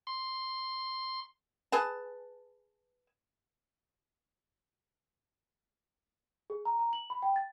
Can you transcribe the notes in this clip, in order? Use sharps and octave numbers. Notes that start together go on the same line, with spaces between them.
C6
G#4 B4 A5
G#4
A#5
A#5
F#7
B5
G5
A6